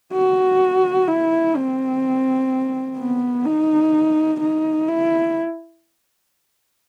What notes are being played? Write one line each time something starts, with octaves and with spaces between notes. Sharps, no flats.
F#4
E4
C4
B3
D#4
D#4
E4